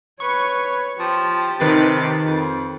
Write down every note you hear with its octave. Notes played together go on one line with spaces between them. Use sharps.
B4 C#5 C#6
F3 G4 A5
C3 D#3 B4 A6
F2